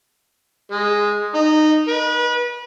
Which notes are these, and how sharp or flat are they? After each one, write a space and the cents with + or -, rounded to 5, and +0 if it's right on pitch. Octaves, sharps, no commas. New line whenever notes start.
G#3 -5
D#4 -15
B4 -30